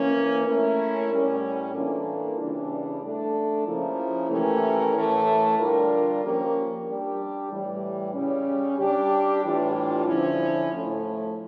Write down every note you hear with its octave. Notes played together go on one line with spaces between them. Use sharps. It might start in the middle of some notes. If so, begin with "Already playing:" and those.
Already playing: E3 A#3 C#4
A3 C#4 E4 A#4
A2 G3 C#4
E3 A#3 D4 F4 A4
C#3 E3 G3 D4
A3 D4 A4
C#3 F3 A#3 E4
E3 A3 C#4 G4 A#4
A2 E3 A3
D3 G3 D4 F4 A#4
F3 A#3 C#4 G4 A#4
G3 D4 G4
A2 E3 G3
C#3 G3 C#4
G3 D4 G4
A2 E3 G3 D4 F4
D3 F3 C#4 E4
A2 F3 A3